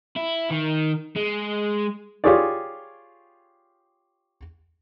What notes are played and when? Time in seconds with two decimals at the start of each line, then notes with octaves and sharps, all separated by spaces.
0.16 E4
0.50 D#3
1.16 G#3
2.24 F4 G4 G#4 C#5 D5